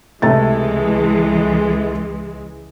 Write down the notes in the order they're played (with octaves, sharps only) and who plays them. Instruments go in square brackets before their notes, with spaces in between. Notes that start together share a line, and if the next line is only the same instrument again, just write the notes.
[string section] C#2 E3 G#3 [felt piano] C3 A3 A6